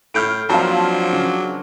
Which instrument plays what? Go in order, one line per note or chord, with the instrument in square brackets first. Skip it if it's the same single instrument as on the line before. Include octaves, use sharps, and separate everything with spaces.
[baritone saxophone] A2 [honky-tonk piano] F6 G6 D7
[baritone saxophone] F3 [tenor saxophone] F#3 [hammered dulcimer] A#3 C4 D4 [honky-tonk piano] F5 A5
[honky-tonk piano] C#3